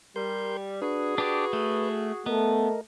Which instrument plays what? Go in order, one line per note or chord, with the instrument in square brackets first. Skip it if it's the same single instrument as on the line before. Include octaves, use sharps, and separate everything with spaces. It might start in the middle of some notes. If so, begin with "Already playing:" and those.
[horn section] G3 [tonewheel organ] A#4 C6 G6
[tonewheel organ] D4 B4 [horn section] F#4 G#4
[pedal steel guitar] D4 G4 D5 [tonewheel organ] B4
[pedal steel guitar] A3
[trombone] A3 [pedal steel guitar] B3 [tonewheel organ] A#4 D#5